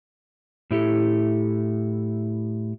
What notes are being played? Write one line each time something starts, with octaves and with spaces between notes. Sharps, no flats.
A2 E4 G4 A4